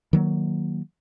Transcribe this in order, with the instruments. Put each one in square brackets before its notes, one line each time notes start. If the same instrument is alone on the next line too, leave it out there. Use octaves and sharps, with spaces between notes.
[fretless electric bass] D#3 F#3 A#3